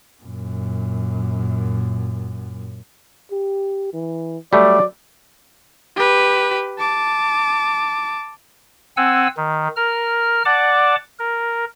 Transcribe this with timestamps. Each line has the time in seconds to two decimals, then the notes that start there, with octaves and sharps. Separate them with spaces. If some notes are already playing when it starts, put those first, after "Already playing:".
0.23 F#2 A#2
3.31 G4
3.94 E3
4.53 F#3 G3 A3 D5
5.96 G4 B4
6.79 A5 D6
8.97 C4 F#5 G#5 E6
9.37 D#3
9.76 A#4 F6
10.45 D5 F#5 A5 D6
11.19 A#4